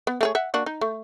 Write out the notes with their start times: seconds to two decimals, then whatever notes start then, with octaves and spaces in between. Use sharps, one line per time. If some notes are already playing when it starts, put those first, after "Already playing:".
0.07 B3
0.21 A3 G#4 C#5
0.35 E5 F#5
0.54 A#3 D4 F#4
0.66 D#4
0.81 A3